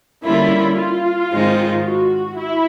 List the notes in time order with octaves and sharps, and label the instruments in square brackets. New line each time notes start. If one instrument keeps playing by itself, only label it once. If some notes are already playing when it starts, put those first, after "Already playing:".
[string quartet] D3 G3 A#3 C#4 F4 [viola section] E4
[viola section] F4
[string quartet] G#2 D#3 G#3 C4 D#4
[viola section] F#4
E4